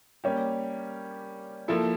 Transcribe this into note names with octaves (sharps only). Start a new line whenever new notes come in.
G3 A#3 C#4 G4
F3 A#3 E4 A4